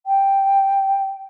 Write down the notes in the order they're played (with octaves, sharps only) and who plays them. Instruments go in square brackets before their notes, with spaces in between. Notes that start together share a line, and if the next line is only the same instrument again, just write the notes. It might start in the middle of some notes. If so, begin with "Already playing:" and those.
[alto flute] G5